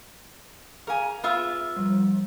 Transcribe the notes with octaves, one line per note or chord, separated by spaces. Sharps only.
G#4 A#4 F5 G#5
B3 F4 E5
F3 G3